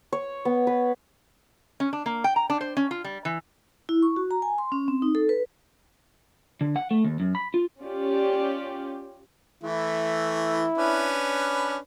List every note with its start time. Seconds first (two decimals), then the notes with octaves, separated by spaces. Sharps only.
0.12 C#5
0.45 B3
0.67 B4
1.80 C#4
1.93 D4
2.06 A#3
2.24 G5
2.36 A#5
2.50 D4
2.61 C5
2.77 C#4
2.91 F4
3.04 G3
3.25 E3
3.89 E4
4.02 C#6
4.16 F#4
4.31 A#5
4.42 G#5
4.58 C6
4.72 C#4
4.88 C4
5.02 D#4
5.15 A4
5.29 B4
6.61 D3
6.76 F#5
6.91 A3
7.04 D#2
7.20 F#2
7.35 B5
7.54 F4
7.82 C#4 F4 G4 D5
9.63 E3 A3 E4
10.78 C#4 D4 B4